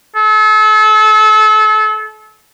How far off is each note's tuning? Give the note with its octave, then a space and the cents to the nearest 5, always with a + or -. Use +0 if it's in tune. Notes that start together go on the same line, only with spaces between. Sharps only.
A4 -35